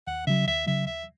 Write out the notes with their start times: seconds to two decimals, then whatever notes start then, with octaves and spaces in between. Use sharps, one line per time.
0.07 D#2 F#5
0.27 C#3 F#3 E5
0.47 D#2 E5
0.67 C#3 F#3 E5
0.86 D#2 E5